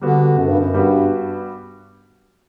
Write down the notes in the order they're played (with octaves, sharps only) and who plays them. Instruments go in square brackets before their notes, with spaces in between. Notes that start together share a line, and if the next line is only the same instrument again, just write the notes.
[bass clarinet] D3 [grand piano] G3 B3 F#4
[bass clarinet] F#2
G2
F#2
[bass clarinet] G2 [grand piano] G3 B3 F#4